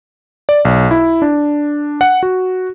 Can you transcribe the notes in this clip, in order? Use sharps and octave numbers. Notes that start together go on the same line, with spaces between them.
D5
B1
E4
D4
F#5
F#4